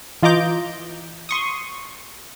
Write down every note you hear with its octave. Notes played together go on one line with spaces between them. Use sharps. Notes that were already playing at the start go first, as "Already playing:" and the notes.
E3 F4 D#5 A#5 D6 G6
C6 C#6 D#6